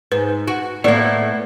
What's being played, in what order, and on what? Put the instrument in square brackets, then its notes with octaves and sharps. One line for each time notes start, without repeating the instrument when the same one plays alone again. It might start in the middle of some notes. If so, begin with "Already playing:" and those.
[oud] G#2 [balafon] B4
[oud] F#4
[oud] A2 E4 C#5 [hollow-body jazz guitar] A#3 B3 [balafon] D5